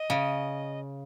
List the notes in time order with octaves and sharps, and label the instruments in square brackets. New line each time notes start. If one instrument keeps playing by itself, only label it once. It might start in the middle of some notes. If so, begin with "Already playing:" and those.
Already playing: [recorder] D#5
[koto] C#3